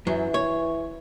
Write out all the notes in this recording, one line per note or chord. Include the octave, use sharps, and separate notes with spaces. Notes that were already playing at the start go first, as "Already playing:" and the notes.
F#2 E3 F#3
C#5